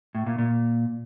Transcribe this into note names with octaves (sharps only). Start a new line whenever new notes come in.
A2
A#2
A#2